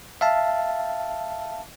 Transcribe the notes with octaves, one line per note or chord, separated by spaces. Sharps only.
E5 F5 A5